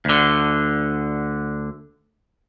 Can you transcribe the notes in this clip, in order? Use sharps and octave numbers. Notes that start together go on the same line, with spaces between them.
D2 D3